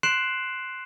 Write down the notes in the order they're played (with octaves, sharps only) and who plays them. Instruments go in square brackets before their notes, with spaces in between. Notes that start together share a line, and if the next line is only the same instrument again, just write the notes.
[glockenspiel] C6 F#6 C7 D7 E7 F#7